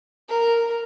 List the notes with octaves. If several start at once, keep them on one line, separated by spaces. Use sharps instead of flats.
A#4